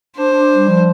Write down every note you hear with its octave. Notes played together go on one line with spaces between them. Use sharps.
D4 C5
D4
G3
F3